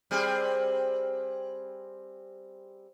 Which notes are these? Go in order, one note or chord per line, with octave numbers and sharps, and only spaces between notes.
G3 C4 G#4